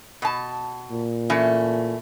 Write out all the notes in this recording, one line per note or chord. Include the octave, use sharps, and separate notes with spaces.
B2 A5
A#2
E3 A3 C#4